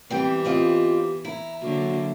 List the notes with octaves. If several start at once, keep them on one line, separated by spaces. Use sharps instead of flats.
E3 G3 B3 C4 G4 G5
C4 F4 D#5
E4 A#5
D3 F#3 A#3 F#4